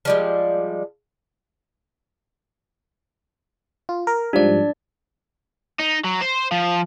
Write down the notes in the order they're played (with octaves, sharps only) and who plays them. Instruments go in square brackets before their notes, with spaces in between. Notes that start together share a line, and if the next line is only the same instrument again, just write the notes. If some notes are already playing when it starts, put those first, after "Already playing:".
[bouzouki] F3 G3 G#3
[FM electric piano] F4
A#4
[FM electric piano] G#2 F3 G3 [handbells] D4 D5
[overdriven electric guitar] D#4
F#3
C5
F3